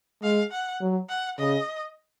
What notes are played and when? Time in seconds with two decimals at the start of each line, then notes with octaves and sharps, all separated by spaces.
0.23 G#3 F5
0.52 F#5
0.81 F#3
1.09 F#5
1.38 C#3 D#5